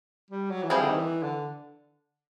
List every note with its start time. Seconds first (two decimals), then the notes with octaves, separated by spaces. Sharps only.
0.30 G3
0.50 F#3
0.63 E3
0.70 F3 G3 C4 E4 G#4 C5
0.81 D3
0.89 D#3
0.96 E3
1.23 D3